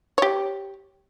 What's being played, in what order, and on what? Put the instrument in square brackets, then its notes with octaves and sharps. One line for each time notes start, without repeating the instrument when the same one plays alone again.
[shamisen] G4 C#5